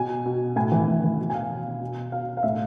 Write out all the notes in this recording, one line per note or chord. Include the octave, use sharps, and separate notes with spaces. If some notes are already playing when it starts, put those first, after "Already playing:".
Already playing: B2 G#5
B2
A2 G#5
E3
A2
E3
B2
G#5
F5
B2
B2
B2 F5
F5
A2 E5